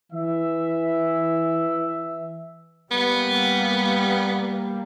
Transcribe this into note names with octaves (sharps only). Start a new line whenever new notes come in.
E3 E5
G3 A#3 B3